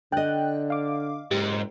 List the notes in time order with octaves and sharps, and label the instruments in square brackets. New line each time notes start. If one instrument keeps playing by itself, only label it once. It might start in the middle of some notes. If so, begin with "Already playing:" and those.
[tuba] D3 [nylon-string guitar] D5 D#5 [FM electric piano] G5 F#6
[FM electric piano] F5 D6
[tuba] F#1 [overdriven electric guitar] G#2 [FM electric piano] G4